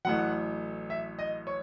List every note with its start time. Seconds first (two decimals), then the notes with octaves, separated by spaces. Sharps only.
0.05 A1 A2 F#3 F#5
0.90 E5
1.19 D#5
1.47 C#5